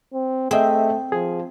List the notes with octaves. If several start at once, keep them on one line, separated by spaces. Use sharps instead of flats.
C4
A3 C4 G#4 D#5 E5
F3 G#4